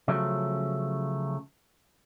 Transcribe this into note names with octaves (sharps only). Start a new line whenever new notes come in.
C#3 F3 F#3 A3